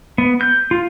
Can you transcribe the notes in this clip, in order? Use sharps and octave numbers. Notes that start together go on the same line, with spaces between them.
B3
G6
F4